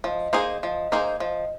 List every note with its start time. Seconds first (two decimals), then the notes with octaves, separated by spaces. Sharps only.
0.04 F3 D#5
0.33 A#3 D#4 G#4 C5
0.62 F3 D#5
0.92 A#3 D#4 G#4 C5
1.20 F3 D#5